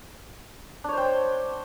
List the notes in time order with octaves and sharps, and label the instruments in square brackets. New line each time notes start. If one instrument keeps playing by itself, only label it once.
[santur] D4
C#5
C5
G5